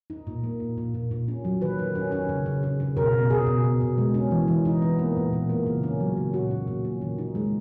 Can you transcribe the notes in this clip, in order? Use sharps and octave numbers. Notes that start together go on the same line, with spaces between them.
D#4
A#2
A#3
A#2
A#2
A#2
A#2
C#4
F#3
D#3 B4
D#3
C#4
C#4
C#3
C#3
C#3
C#3
B2 A#4
B2
B2 G#4
B2
B2
B2
G#3
C#4
E3
E3
D#4
B3
A#3
A#2
A#2
A#3
C#3
C#4
F#3
C#3
A#2 F#4
A#2
A#2
C#4
D#3
D#4
G#3